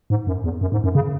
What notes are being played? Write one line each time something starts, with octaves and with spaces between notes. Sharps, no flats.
G#2
F#2
E2
F#2
G#2
F#2
C#3